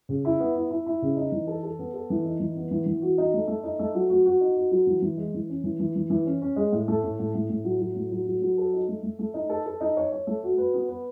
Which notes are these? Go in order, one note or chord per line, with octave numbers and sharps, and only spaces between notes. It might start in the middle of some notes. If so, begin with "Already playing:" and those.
C#3
E4
B3
E4
E4
E4
C#3
D#4
E3
A4
A4
B3
A4
E3
D#4
E3
B3
E3
E3
F#4
D#4
A3
A3
D#4
A3
F#3
F#4
F#4
D#4
F#4
F#3
E3
E3
G#3
E3
C#4
E3
E3
E3
E3
C#4
C#4
G#3
A2
A3
A2
A2
A2
A2
F#3
F#3
A2
F#3
F#3
F#3
A4
D#4
A3
A3
A3
D#4
A4
A4
D#4
C#5
C#5
A3
F#4
B4
B3
B4